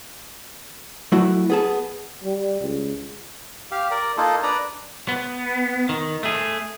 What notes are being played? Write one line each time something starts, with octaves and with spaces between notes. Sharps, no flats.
F#3 A3 E4 F#4
B3 G#4 A5
G3
C#2
G4 F5
A#4 D5
A#3 D#4 F4 A4
D4 B4 D5 A#5
B3
D#3
A3 G#4